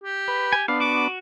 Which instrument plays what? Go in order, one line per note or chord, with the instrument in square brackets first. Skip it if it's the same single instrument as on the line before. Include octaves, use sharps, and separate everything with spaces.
[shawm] G4
[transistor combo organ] B4
[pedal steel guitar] G#5
[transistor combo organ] B3 D4 [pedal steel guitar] F5
[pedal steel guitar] F#4 [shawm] D6